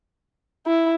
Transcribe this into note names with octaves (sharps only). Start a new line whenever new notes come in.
E4